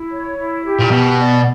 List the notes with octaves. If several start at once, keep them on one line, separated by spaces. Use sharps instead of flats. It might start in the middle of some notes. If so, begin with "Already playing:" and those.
Already playing: E4
C#5
E4
G4
A#2
B2 A#4
D5